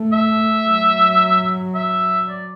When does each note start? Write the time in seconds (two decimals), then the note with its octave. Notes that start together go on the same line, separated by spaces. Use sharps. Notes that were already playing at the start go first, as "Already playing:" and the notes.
Already playing: A3
0.13 E5
0.67 F#3
1.75 E5
2.29 D5